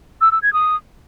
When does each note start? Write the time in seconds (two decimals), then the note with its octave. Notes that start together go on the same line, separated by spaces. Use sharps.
0.21 E6
0.32 E6
0.42 G#6
0.53 D#6